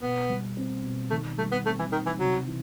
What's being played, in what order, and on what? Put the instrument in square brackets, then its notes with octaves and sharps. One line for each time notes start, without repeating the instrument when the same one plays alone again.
[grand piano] B2 [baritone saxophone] B3
[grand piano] G3
C4
B2
[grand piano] D#3 [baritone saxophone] A3
[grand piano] G3 [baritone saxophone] A3
[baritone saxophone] B3
[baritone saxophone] A3 [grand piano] C4
[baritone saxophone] E3
[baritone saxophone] D#3 [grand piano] D#4
[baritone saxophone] E3
[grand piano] C3 [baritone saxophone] F#3
[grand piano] E3